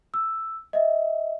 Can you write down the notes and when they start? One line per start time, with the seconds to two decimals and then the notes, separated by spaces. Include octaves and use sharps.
0.14 E6
0.73 D#5 E5